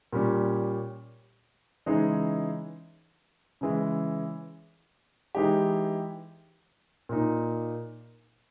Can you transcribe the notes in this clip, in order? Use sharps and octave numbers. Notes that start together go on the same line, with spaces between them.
A#2 G3 C#4
C#3 E3 G#3 D#4 G#4
C#3 E3 G#3
E3 G#3 D#4 G4
A#2 A#3 D#4